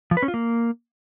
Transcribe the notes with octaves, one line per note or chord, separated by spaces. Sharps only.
F3
B4
C#4
F4
A#3